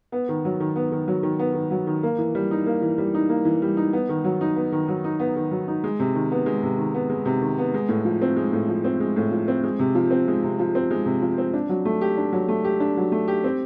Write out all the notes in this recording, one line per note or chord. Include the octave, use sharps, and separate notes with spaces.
B3
D#3
F#3
D#3
B3
D#3
F#3
D#3
B3
D#3
F#3
D#3
A#3
E3
G3
D#4
A#3
E3
G3
D#4
A#3
E3
G3
D#4
B3
D#3
F#3
D#4
B3
D#3
F#3
D#4
B3
D#3
F#3
D#4
G#3
C3
D#3
B3
G#3
C3
D#3
B3
G#3
C3
D#3
B3
G#3
A2
F3
C4
G#3
A2
F3
C4
G#3
A2
F3
C4
G#3
C3
F3
C4
G#3
C3
F3
C4
G#3
C3
F3
C4
D4
F#3
A3
G4
D4
F#3
A3
G4
D4
F#3
A3
G4
C4